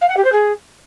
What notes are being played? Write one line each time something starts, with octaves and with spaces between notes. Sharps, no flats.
F5
F#5
G4
C5
G#4